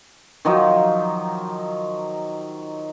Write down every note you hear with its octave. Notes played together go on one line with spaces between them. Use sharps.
D#3 F3 F#3 D#4